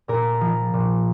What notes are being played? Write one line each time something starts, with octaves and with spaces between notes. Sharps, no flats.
A#2 A#4
F3
A#2